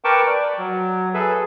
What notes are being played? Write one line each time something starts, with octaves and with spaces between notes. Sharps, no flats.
A#4 B4 G5 A5 C#6 D6
D5
F#3
G#4 A4 B4 E5